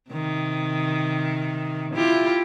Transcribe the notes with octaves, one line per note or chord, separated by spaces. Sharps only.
C3 D#3
E4 F4 G4